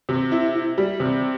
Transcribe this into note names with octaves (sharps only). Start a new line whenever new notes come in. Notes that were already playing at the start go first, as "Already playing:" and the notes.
C3
E4
E4
G3
C3